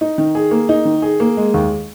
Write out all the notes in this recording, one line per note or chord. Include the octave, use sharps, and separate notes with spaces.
D#4
D#3
G#4
A#3
D#4
D#3
G#4
A#3
G#3
D#2